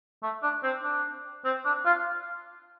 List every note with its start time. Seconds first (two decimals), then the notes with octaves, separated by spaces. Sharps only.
0.23 A3
0.43 D4
0.63 C4
0.84 D4
1.45 C4
1.65 D4
1.86 F4